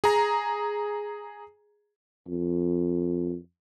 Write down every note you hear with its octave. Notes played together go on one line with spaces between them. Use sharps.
G#4 A#5
F2